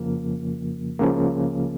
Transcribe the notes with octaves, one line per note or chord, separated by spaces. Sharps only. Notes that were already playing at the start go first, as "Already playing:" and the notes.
Already playing: F2 C#3 F3 A#3
C#2 C#3 F3 A#3